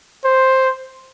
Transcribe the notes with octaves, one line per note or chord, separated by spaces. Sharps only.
C5